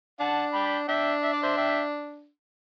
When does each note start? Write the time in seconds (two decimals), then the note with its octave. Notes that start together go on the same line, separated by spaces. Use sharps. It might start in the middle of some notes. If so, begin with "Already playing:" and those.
0.20 D4 F#5 A5
0.54 G5 B5
0.88 D4 E5 G5
1.23 E5
1.33 D5
1.43 C5 E5
1.57 E5 G5